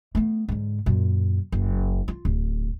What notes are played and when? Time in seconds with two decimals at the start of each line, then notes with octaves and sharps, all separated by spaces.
0.15 A3 B3
0.49 G#2 D3
0.86 F#2 A#2
1.52 F#1
2.08 F4
2.25 D1